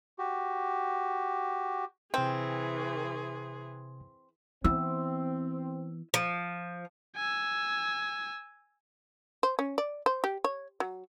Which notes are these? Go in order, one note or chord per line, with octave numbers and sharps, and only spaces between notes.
F#4 G4
C3 E3 C4 G#4 G5 F6
E3 B3 C4 E4 E6
F3
G#5 E6
C5
C#4
D5
C5
G4
C#5
F#3